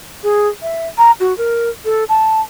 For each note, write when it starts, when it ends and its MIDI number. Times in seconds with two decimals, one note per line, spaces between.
0.23 0.48 68
0.62 0.87 76
0.98 1.11 82
1.20 1.36 66
1.38 1.70 70
1.85 2.04 69
2.09 2.41 81